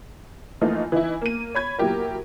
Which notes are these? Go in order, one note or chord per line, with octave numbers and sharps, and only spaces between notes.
E3 F3 A3 A#3 D#4 F4
E3 D#4 E4
A#3 D#7
C#5 B5 G#6
A#2 F#3 E4 G4 A#4